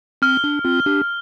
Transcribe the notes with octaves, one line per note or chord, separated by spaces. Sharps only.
C4 F6
D4
C4 F4
D4 G4